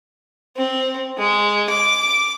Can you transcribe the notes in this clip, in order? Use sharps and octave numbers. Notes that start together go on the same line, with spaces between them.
C4
G#3
D6